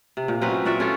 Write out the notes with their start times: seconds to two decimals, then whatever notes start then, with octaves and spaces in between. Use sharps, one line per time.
0.17 C3
0.28 A#2
0.41 F#3 C4 C#4 B4
0.65 A#2 F#4 D5 E5
0.80 C#4 E4 F4 A4